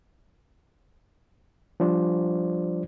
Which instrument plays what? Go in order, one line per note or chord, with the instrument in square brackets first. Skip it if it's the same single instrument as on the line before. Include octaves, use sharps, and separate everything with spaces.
[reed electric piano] F3 G3 D4 F4 C5 D5